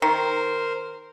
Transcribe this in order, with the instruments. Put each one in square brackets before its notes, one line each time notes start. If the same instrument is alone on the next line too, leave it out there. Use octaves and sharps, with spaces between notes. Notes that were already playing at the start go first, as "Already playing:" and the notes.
[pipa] D#3 [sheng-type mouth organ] A#4 C5